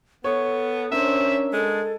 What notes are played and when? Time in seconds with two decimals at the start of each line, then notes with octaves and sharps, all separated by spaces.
0.24 B3 A4 C#5
0.92 C#4 D4 A#4 C5 E5
1.53 G#3 A4